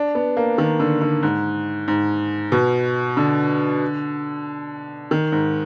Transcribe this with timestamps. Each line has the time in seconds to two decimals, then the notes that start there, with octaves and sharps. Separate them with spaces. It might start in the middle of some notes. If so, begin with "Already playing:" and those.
Already playing: D4
0.15 B3
0.37 A#3
0.58 D#3
0.80 D3
1.01 D3
1.23 G#2
1.88 G#2
2.52 B2
3.17 D3
5.11 D#3
5.32 G#2